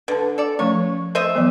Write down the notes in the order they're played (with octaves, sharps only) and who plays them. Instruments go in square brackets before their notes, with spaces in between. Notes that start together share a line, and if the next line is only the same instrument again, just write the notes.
[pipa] D3 [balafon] B4 A5
[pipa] A4 D5
[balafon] F3 A3 C#4 [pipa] C#5
[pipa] C5 D#5 E5
[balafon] E3 F#3 B3